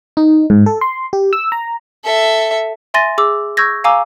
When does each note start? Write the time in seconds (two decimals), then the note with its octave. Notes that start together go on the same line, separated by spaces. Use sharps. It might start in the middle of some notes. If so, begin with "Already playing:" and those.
0.17 D#4
0.50 G#2
0.66 A4
0.81 C6
1.13 G4
1.33 E6
1.52 A#5
2.05 A4 E5
2.94 E5 G#5 C6 A6 A#6 D#7
3.18 G#4 D6 E6
3.57 C#6 E6 G6 G#6 A#6
3.84 F5 G#5 A#5 D6 E6